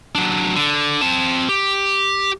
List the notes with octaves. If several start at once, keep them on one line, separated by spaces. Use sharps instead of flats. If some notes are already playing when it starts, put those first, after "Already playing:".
F#3 D4
D3
C4 A5
G4